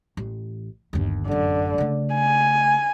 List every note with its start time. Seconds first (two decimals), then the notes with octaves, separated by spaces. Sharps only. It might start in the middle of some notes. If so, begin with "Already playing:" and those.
0.17 A1
0.93 G1 D#2
1.28 A1 F#2 D3
1.78 C#3 A3
2.15 G#5